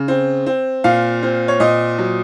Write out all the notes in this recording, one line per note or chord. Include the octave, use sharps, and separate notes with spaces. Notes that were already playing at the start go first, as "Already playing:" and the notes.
Already playing: C#3
C4
C4
A#2 F5
C4
C#5
A#2 D#5
F#3